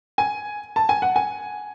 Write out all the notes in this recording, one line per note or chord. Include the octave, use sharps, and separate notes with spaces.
G#5
A5
G#5
F#5
G#5